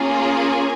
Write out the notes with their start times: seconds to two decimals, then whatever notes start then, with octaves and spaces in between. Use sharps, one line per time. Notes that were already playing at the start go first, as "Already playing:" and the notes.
Already playing: A#3 C#4 F4 G#4
0.22 G#5